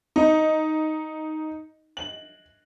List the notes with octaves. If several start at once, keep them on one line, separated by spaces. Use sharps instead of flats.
D#4
F#7